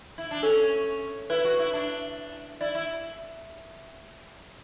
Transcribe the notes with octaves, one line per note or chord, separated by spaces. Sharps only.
E4
D4
C#4 A4
E4 B4
F#4
E4
D4
E4 D5
E4